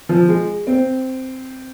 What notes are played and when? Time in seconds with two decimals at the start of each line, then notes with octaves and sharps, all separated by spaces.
0.09 F3
0.29 G#3
0.67 C4